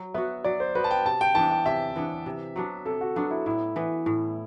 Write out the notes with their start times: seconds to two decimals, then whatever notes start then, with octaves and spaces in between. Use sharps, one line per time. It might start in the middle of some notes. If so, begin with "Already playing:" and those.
Already playing: F#3
0.14 B3 F#4 E5
0.44 F#3 D5
0.60 C5
0.75 B3 F#4 B4
0.84 A5
0.91 G5
1.05 C3 A5
1.21 G5
1.35 E3 B3 D4 A5
1.51 G5
1.66 C3 E5
1.96 E3 B3 D4
2.26 C3
2.56 F#3 B3 D4
2.85 C3 A4
3.01 F#4
3.16 F#3 B3 D4 F#4
3.31 E4
3.46 A2 E4
3.76 E3 B3
4.06 A2